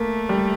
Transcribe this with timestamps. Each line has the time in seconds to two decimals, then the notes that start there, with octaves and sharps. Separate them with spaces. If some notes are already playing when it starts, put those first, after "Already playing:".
Already playing: A3 A#3
0.29 G3